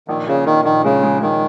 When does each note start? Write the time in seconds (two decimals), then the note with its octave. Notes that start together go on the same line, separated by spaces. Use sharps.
0.08 A#1 D#3
0.27 A#2 C#3
0.46 A#1 D#3
0.65 A#1 D#3
0.84 C#3 G#3
1.03 G#3
1.22 D#3 G#3